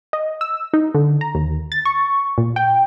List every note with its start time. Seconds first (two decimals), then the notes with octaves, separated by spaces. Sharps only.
0.13 D#5
0.41 E6
0.74 D#4
0.94 D3
1.21 A#5
1.35 D#2
1.72 A6
1.85 C#6
2.38 A#2
2.56 G5